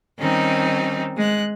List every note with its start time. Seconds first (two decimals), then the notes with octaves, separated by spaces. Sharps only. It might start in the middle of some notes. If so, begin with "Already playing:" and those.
0.20 D#3 G3 C4 C#4 D#4
1.18 G#3 F#6